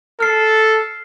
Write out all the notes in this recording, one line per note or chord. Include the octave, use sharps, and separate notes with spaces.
A4 F6 C7